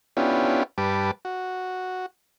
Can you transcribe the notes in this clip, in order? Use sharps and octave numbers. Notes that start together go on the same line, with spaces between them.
B3 C#4 D4 E4 F4 G4
G2 G3 B4 A5 D6
F#4